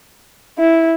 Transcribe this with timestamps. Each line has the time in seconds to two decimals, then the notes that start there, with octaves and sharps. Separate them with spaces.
0.59 E4